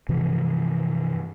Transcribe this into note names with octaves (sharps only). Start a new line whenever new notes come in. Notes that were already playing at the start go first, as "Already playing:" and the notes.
G2 C3 E3 F3